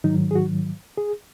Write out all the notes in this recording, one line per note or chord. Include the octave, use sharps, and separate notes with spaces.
G#2 D#3 F#3 D#4
G#4
F#4
G#4